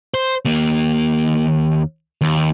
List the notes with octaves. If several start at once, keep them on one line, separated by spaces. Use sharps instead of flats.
C5
D#2 A#3
D#2